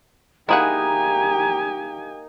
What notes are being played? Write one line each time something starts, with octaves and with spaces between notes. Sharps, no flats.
A#3 D#4 E4 G4 G#4 F#5 G#5 A#5